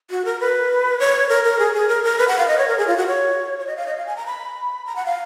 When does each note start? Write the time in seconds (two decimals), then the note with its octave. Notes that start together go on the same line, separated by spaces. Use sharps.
0.11 F#4
0.25 A#4
0.40 B4
1.00 C#5
1.29 A#4
1.44 A#4
1.59 G#4
1.74 G#4
1.89 A#4
2.04 A#4
2.18 B4
2.28 F#5
2.38 F5
2.48 D#5
2.58 C#5
2.68 A#4
2.78 G#4
2.87 F4
2.97 F#4
3.07 C#5
3.59 C#5
3.67 D#5
3.77 F5
3.87 D#5
3.97 F5
4.06 G#5
4.16 A#5
4.26 B5
4.86 A#5
4.96 F#5
5.06 F5